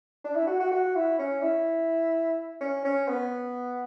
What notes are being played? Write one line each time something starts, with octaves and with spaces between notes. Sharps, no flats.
D4
E4
F#4
F#4
F#4
E4
C#4
E4
C#4
C#4
B3